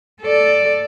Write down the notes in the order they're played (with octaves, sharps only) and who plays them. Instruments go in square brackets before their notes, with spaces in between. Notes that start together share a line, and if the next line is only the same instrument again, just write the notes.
[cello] A4 D5